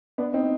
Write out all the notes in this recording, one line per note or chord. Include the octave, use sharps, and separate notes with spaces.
B3 D4
C4 D#4